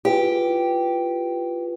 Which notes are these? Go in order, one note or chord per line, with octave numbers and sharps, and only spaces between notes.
E4 F4 G4 B4